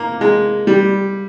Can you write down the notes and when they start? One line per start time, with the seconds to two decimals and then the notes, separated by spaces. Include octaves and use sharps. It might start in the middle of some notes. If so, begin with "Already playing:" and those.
Already playing: A#3
0.21 G#3
0.67 G3